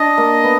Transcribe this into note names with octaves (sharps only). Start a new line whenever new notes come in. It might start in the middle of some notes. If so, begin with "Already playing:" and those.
Already playing: D4 D#5
A#3
B3